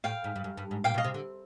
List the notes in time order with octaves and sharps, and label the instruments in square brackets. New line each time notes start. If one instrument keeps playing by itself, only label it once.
[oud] A2 [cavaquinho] F5 G5
[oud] G#2
G2
F#2
G2
G#2
[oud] A#2 [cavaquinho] F5 G5
[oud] B2
[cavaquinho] D#5 F5
[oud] C3
D3